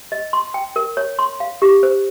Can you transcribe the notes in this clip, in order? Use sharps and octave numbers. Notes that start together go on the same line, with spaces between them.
D#5
C6
G5
A#4
C#5
C6
F5
G4
C5